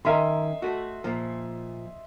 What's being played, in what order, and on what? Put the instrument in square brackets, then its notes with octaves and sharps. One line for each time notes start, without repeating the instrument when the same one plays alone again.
[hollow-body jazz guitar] D#3 C#4 A#4 [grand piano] D#5 E5 C6
[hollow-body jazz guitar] A3 F#4
A#2 F3